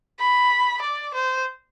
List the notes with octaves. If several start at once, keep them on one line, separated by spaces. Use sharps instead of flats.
B5
D5
C5